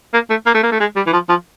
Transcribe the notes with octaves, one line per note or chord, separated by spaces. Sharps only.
A#3
A3
A#3
A3
A#3
A3
G#3
G3
E3
F3
F3